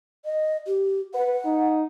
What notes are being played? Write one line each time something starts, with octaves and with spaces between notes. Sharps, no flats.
D#5
G4
B4 F#5
D#4